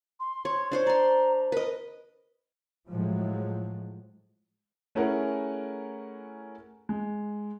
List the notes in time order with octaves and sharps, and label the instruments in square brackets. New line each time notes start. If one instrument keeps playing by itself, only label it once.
[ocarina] C6
[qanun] C#5
D4 C5 C#5
[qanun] D5 C6 [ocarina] A#5
[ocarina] A#4 [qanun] B4 D#5
[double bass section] A2 F3 F#3 G#3
[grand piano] A3 C#4 E4 G#4 A#4 F#5
G#3